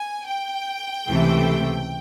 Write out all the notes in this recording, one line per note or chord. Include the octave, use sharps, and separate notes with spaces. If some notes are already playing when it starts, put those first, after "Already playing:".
Already playing: G#5
G5
C#2 C3 E3 A3